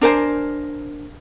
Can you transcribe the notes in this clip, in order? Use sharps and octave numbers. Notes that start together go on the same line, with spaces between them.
D4 A#4 C5 G#5